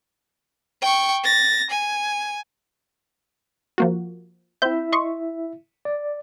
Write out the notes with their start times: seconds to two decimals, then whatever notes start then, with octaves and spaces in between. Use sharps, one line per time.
0.82 G5 C#6
1.24 A6 A#6
1.71 G#5
3.78 F3 A#3 F#4
4.62 C4 E4 E5 G6
4.92 D#5 C6 C#6
5.85 D5